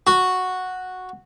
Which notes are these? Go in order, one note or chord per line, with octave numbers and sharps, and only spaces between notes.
F#4